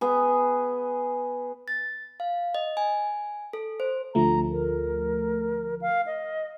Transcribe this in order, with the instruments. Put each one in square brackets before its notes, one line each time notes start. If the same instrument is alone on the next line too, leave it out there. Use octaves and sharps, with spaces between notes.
[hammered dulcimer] B3 G#4
[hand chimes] A6
F5
D#5
G#5
A4
C5
[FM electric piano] D2 F3 A3 [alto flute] A#5
[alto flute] A#4
F5
D#5